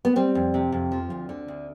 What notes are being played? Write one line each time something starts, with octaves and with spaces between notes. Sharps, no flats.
B3
G3 C4
F2
C3
F2
F3
D2
D3
D2